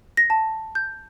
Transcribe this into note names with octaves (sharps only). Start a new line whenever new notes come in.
A#6
A5
G6